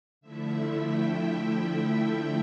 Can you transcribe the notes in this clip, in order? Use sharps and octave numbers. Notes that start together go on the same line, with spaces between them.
D3 F3 A3 E4 E5
G5
G5